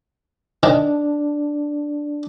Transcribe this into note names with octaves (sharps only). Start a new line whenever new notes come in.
D#3 D4